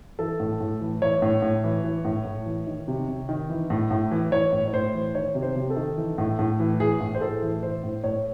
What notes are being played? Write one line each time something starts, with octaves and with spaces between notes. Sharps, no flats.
E3 A4
A2
A2
E3
E3 C#5
A2
A2
E3
E3
A2
A2
E3
D#3
C3
C3
D#3
E3
A2
A2
E3
E3 C#5
A2
C#5
A2 C5
E3
D#3 C#5
C3
C5
C3
A4
D#3
E3
A2
A2
E3
E3 G#4
A2
C5
A2 A4
E3
E3 C5
A2
A2 C#5